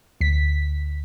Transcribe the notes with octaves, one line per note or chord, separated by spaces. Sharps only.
D2 B6